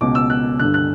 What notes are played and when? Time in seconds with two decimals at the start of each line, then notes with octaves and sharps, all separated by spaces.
0.01 C#2 B2 D6
0.15 E6
0.30 F#6
0.59 G2 D3 F#6
0.74 F#6